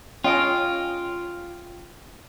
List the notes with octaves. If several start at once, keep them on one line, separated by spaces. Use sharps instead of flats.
C#4 F4 D#5 G5 D#6 D7